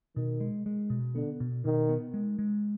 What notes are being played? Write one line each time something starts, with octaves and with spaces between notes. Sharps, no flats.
B2 D#3
G#3
G#3
B2
D3 B3
B2
B2 D#3
B3
G#3
G#3